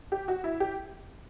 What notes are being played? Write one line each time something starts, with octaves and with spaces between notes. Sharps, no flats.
G4
F#4
E4
G4